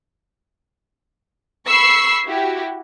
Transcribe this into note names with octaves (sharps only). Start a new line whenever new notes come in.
B5 C#6 E6 C7
E4 F#4 G4